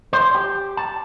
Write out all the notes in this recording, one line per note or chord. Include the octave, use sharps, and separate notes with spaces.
C5
G4
A5